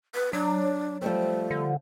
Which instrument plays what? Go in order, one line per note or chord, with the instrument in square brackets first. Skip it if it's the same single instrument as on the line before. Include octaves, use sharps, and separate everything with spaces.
[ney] B4
[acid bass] F#3 [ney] D4
[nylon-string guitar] F3 G3 C4 [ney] A3
[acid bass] D3